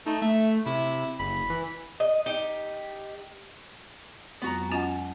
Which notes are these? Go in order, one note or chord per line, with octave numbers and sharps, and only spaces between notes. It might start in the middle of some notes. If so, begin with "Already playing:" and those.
A3 D#4
A3 E5
C3 E4
F#1 B5
E3
D#5
D#4 G4
F2 F#3 G#3 B3 F#4 A#5
C#4 F4 D#5 F#5 G#5